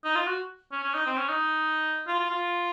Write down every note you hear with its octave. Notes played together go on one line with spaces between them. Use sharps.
D#4
F4
F#4
C#4
C#4
D#4
C4
C#4
D#4
F4
F4
F4